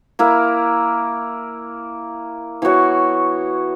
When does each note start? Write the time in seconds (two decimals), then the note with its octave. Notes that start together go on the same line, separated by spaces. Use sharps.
0.19 A#3 E4 A#4
2.62 E3 B3 F#4 C#5